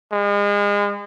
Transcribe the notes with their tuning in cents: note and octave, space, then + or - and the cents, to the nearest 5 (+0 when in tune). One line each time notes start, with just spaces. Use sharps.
G#3 -35